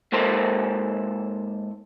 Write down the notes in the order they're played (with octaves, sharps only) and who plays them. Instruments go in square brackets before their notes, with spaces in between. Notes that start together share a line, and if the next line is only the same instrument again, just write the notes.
[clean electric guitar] G#2 A#3 A4 C5